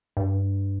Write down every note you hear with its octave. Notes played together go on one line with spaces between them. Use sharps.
G2